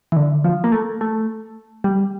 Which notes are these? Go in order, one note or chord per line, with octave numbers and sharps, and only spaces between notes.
E3
D3
F3
A#3
A3
A3
G3